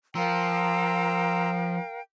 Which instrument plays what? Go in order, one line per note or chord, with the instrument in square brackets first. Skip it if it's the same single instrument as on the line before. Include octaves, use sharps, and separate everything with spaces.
[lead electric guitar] F3 [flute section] A#4 F5 G5 [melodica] A#5 C6 E6